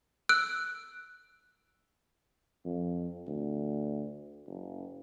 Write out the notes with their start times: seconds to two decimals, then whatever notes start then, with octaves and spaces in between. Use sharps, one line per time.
0.29 E6 F#6 D7
2.65 F2
3.27 D2
4.47 F#1